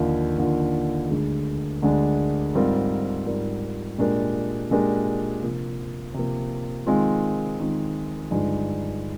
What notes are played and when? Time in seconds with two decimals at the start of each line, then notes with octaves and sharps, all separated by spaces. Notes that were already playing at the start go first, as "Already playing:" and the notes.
Already playing: D#2 D3 F3
0.38 D#2 D3 F3
1.10 D2 D3 G#3 D4 G#4
1.82 D2 D3 G#3 D4 G#4
2.55 G#2 G3 C4 F4 A#4
3.26 G#2 G3 C4 F4 A#4
3.98 A#2 G#3 D4 G4 A#4
4.71 A#2 G#3 D4 G4 A#4
5.43 C3 F3 A#3
6.14 C3 F3 A#3
6.87 D#3 G#3 C4 F4
7.59 D#3 G#3 C4 F4
8.31 G2 D3 F3 G#3 D#4